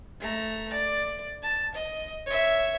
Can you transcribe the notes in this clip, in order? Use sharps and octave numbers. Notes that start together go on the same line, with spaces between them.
A3 A#5
D5
A5
D#5
C#5 E5